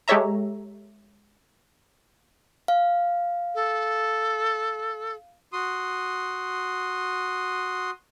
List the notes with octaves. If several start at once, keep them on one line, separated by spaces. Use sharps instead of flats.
G#3 G4 A4 C#5 E5 A#5
F5
A4
F#4 C6 D#6